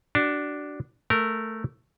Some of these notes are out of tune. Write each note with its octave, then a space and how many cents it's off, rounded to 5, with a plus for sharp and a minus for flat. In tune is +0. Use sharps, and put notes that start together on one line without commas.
D4 +0 F#4 +35
A3 +0 A#4 -10